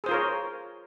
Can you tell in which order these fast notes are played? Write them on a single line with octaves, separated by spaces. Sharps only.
G#4 C5 F4 A#4 C#5